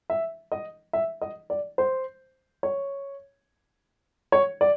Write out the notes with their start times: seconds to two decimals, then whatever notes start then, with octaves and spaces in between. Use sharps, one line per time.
0.10 E5
0.52 D#5
0.93 E5
1.21 D#5
1.50 D5
1.78 C5
2.63 C#5
4.32 C#5
4.61 D5